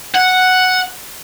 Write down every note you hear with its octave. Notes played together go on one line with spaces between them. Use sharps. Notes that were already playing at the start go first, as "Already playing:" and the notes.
F#5